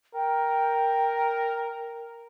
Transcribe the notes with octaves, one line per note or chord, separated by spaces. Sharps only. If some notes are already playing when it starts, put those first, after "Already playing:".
A#4 G5